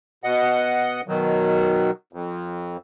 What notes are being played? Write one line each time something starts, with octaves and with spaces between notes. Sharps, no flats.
B2 D#5 F#5
B2 D#3 F#3
F2